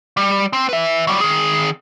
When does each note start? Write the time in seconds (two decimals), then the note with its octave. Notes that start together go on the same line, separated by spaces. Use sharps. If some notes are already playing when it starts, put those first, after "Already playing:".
0.17 G3
0.53 C4
0.69 B4 E5
1.07 F#3 G3
1.21 D#3 G#4